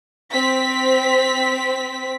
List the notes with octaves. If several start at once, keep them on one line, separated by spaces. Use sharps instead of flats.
C4 B6